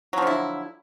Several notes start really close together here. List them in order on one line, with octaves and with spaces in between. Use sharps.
F#3 F3 D3 E4